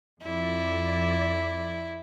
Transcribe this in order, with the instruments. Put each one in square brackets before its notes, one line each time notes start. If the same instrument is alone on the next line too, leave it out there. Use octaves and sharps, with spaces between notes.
[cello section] F2 D5 [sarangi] E4